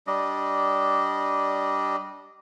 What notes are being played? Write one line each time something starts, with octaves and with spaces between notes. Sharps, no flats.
G3 D4 D#5